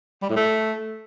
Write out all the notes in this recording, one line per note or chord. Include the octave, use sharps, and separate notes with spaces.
G3
A2
A3